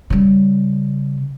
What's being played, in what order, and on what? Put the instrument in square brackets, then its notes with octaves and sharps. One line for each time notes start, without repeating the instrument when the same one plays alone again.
[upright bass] C#3 G3